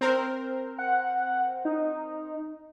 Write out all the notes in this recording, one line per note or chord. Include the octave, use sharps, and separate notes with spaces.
C4 A#4 C5
F#5
D#4